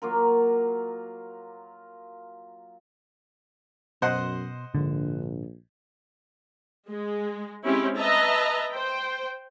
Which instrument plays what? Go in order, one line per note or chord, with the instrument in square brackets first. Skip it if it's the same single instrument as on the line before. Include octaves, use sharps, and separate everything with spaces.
[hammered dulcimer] F#3 A#3 F4 A#4
[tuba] F#2 [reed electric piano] B2 C6 [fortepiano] C5 D#5 F#5
[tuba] A#1 [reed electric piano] G#2 [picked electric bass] D3
[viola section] G#3
G#3 C4 C#4 E4 G4
B4 D#5 E5 A5 A#5
C5 G5